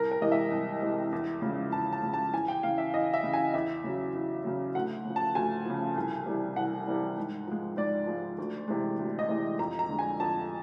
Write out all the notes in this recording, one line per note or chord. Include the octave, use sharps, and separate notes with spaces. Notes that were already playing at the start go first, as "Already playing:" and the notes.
Already playing: C2 A#4
A#4
C3 E3 G#3 D#5
E5
C2
C3 E3 G#3
E2
C#3 F3 G#3
E2 A5
A5
C#3 F3 G#3
A5
E2 G#5
G5
C#3 E3 F5
E5
E2 D#5
E5
C#3 E3
G#5
E2 E5
C#3 F#3
E2
C#3 F#3
D2 F#5
C#3 F3
A5
D2 G#5
C#3 F3
C2
C3 E3 G3
C2 F#5
C3 E3 G3
G#2
F3 G#3
G#2 D5
F3 G#3
D2
C3 E3 G#3
D2
D#5
C3 E3 G#3
F2 A#5
A#5
D3 F3 G#3
G#5
F2 A5